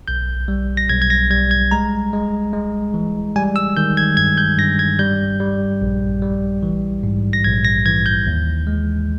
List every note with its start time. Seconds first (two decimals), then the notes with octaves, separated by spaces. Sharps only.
0.08 B1 G6
0.48 G3
0.77 A#6
0.89 B1 G#6
1.02 G#6
1.10 A#6
1.30 G3 G#6
1.51 G#6
1.71 G#3 A#5
2.13 G#3
2.53 G#3
2.94 E3
3.36 G3 G#5
3.56 E6
3.77 D#3 G6
3.97 G#6
4.17 G2 G#6
4.38 G6
4.58 G2 A#6
4.79 G#6
4.99 G3 G6
5.40 G3
5.82 A#1
6.22 G3
6.63 E3
7.03 G#2
7.33 A#6
7.44 A#1 G#6
7.65 A#6
7.86 E3 G#6
8.06 G6
8.27 D#2
8.67 G#3